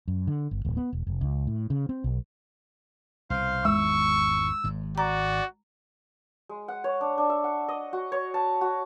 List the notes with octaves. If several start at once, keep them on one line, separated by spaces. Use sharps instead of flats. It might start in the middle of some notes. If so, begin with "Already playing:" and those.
F#2
D3
G1
D1
B3
E1
F1
C#2
A2
C#3
C4
B1
C2 B2 C5 F5 C6
G#1 E2 D#3 G#3 C#6 E6
G#1 G#2
F#4 D5 A#5
G#3
F#5
C#5
D4
D4
E5
F#5
D#5
F#4
C#5
A5
F#4